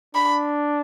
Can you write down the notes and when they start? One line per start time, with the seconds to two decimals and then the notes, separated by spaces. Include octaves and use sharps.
0.15 D4 B5